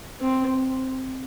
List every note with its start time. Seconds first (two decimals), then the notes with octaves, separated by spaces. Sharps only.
0.21 C4